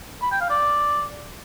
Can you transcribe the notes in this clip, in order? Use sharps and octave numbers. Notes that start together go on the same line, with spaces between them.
B5
G5
F5
D5